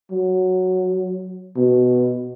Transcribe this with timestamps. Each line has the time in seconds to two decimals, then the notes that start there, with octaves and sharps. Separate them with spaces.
0.11 F#3
1.56 B2